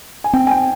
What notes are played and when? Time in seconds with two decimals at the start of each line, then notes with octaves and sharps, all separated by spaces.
0.24 G#5
0.33 C4 G5
0.47 G#5
0.51 G5